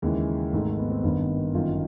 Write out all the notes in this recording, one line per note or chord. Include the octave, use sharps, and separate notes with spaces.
D#2 C#3 E3 G#3
G#1 G#2 D#3 A3
A3
B3
C4
G#1 G2 D#3 B3
G1 F#2 D#3 F4